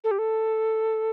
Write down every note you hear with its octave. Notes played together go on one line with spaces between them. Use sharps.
A4
G4
A4